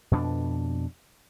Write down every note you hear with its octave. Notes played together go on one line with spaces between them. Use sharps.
F2 B2 C4 D4